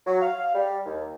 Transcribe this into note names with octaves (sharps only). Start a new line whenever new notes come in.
F#3
F5
G3
D#2